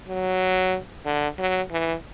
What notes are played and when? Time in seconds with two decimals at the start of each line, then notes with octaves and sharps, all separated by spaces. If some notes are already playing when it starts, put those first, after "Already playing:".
0.09 F#3
1.05 D3
1.39 F#3
1.71 E3